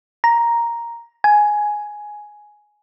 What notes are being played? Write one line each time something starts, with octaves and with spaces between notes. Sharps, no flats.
A#5
G#5